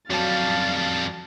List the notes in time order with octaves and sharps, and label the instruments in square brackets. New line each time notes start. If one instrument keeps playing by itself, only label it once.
[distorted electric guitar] F2 G3 [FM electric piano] F#3 A5 [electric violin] F5 A6